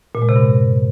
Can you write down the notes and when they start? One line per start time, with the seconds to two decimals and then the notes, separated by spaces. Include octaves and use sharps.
0.15 A#2
0.22 G#3
0.29 C3
0.36 G2